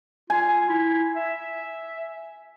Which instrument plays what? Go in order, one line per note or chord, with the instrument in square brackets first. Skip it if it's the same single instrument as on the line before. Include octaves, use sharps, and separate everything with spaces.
[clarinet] F4 [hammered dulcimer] G#5
[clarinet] E4
E5